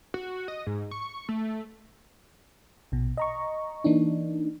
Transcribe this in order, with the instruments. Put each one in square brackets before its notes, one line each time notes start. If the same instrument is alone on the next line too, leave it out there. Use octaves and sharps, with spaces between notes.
[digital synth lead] F#4
D#5
G#2
C#6
A3
[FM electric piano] A#1 B2
D#5 A#5 C#6
E3 A#3 D4 D#4